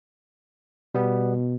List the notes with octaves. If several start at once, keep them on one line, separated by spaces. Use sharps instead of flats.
B2 G3 B3